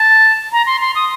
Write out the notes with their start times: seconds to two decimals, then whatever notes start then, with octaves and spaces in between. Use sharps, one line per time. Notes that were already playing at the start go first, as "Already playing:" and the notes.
Already playing: A5
0.52 A#5
0.67 C6
0.81 C6
0.95 D#6